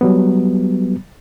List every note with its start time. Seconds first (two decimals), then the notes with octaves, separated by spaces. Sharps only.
0.01 F#3 G3 B3